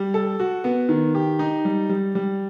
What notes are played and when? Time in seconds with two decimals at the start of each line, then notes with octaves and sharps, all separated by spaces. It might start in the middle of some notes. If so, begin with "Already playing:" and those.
Already playing: G3
0.14 A4
0.40 F#4
0.64 B3
0.89 D#3
1.15 G4
1.39 D#4
1.65 G3
1.89 G3
2.15 G3